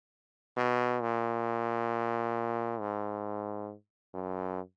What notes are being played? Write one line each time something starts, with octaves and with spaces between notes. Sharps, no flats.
B2
A#2
G#2
F#2